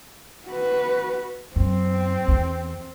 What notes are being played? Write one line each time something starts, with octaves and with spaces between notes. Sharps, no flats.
F#4 B4
F#2 C4
E2